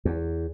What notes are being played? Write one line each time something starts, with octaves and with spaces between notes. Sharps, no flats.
E2